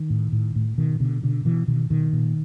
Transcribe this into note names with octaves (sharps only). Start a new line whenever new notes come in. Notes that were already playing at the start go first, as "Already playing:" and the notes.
Already playing: D#3
A2
A2
A2
B2 D#3
B2 D3
B2 D3
B2 E3
B2 D#3
B2 D#3
A#2